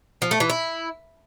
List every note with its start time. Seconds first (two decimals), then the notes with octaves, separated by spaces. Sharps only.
0.22 F3
0.31 A3
0.40 E3
0.50 E4